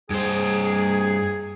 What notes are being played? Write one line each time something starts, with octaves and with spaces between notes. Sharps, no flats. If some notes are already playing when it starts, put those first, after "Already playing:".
G2 G#4 C5